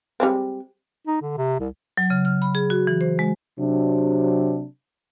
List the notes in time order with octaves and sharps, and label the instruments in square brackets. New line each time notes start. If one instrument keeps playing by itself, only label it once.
[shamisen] G3 G#3 C4
[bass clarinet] D#4
D3
C3
C2
[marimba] F#3
C#3
F6
B5
G#4
F#4
E3
C5
G#3
[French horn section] C3 F#3 D4